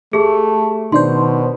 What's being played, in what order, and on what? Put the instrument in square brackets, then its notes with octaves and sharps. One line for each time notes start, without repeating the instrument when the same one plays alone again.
[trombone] A3 [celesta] G4 G#4
[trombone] B2 [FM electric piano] D#3 D4 C5 [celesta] C6